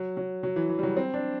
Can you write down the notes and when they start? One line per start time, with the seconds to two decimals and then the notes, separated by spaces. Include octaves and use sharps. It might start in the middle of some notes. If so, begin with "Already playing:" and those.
Already playing: F#3
0.17 F#3
0.43 F#3
0.56 E3
0.69 E3
0.79 G3
0.83 F#3
0.96 C4
1.14 D4